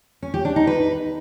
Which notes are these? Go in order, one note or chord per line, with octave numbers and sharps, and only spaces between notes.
C#4
G4
D4
D#4
B4